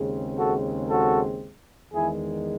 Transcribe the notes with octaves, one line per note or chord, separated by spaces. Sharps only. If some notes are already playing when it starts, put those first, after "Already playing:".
Already playing: D#2 C#3 G#3 C4
F#4 A4
F#4 A4
E2 D#3 G#3 E4 G#4